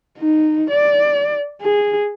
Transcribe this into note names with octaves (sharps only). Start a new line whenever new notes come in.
D#4
D5
G#4